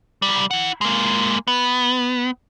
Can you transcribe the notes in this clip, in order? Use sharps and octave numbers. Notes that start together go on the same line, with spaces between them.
C2 G3
E4 F#5
G#3 A#3
B3